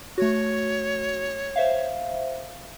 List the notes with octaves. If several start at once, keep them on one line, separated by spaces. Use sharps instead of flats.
A3 F#4 C#5
C5 E5 F5